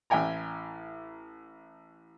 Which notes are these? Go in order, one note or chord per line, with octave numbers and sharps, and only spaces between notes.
A1 E4 G5 G#5 A#5